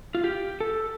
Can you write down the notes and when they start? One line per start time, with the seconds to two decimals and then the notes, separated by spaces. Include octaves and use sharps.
0.15 F4
0.24 G4
0.60 A4